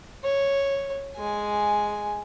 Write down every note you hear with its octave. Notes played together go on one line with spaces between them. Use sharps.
C#5
G#3 G#5